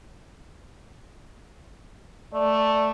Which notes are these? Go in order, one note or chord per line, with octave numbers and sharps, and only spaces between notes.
A3 D5